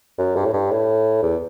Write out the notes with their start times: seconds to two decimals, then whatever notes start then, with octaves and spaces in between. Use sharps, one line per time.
0.18 F#2
0.36 G2
0.45 A2
0.53 G2
0.71 A2
1.22 E2